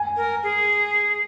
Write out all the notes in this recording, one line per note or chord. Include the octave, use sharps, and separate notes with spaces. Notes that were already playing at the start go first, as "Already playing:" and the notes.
Already playing: G#5
A#4
G#4